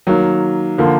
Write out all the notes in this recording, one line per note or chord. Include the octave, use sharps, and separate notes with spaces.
D#3 F#3 A#3
D3 F3 A#3